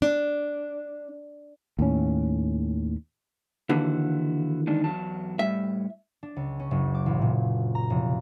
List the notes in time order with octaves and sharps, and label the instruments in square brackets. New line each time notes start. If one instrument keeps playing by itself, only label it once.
[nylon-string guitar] D4
[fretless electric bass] D#2 A2 C#4
[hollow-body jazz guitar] D#2 D3 E3 [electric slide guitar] E4 F#4
[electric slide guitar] G#3 D4 D#4
E2 F#3 A5
[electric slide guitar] A2 G3 [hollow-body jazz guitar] E5
[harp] D4
C#2
C#4
F#1
D6
A1
A#2
A#5
F1